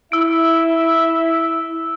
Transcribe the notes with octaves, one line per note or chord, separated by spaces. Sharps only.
E4 E5 E6 D7